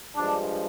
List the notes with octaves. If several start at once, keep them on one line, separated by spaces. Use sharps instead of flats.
G2 F3 G#3 D4